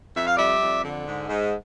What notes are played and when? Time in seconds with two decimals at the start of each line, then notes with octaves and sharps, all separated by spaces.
0.15 F2 E5
0.25 F5
0.35 G3 D5 E5
0.60 F2
0.83 D3
1.06 G#2
1.28 G#2